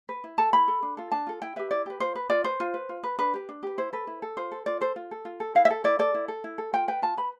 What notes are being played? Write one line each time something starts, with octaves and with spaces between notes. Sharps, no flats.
B4
E4
A4 A5
E4 B5
A4
D4
F4 A4
D4 A5
F4 A4
E4 G5
G4 B4 E5
E4 D5
G4 B4
F4 C5
B4
F4 D5
B4 C5
F4
B4
F4
B4
D4 B4
G4 B4
D4
G4 B4
E4 C5
A4 B4
E4
A4
F4 C5
A4
F4 D5
A4 C5
F4
A4
F4
A4
E4 F5
E5
A4
E4 D5
A4 D5
E4
A4
E4
A4
F4 G5
B4 G5
F4 A5
B4 B5